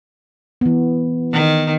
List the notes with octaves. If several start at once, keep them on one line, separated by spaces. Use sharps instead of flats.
E3 B3
D#3